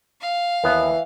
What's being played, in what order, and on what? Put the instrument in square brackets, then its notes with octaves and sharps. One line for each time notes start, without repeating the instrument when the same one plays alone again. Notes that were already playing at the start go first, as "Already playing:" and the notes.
[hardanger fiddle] F5
[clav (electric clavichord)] D#2 B3 [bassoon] E3